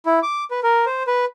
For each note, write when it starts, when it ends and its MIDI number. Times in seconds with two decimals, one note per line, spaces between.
0.06 0.20 64
0.23 0.44 86
0.51 0.60 71
0.63 0.85 70
0.86 1.03 72
1.07 1.25 71